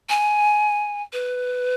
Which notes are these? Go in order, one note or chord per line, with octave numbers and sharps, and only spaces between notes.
G#5
B4